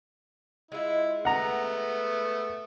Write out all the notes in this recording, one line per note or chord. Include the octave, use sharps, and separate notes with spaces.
G#3 E4 F4
A3 B3 F#5 A#5